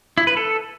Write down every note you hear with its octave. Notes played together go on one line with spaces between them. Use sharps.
E4
B4
A4